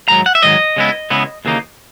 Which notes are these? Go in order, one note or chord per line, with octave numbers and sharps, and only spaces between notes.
G#2 D#3 F#3 A#5
F#5
E5
G#2 D#3 F#3 D#5
C#3 G#3 B3 E4
C#3 G#3 B3 E4
D#2 C#3 E3 A#3 D#4